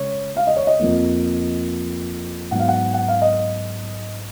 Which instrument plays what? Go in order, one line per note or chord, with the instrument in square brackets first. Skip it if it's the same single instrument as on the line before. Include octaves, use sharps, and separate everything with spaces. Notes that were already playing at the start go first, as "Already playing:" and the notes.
Already playing: [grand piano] C#3 G#3 C#5
F5
D#5
C#5
D#5
F2 F3 A#3
G#2 F#3 B3 F#5
F5
F#5
F#5
F5
D#5